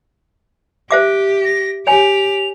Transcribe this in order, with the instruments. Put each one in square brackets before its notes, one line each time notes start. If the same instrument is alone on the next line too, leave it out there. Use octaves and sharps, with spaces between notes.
[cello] G4 [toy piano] C5 E5 D6
[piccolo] A#6
[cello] G4 [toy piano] C#5 G#5 [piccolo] F7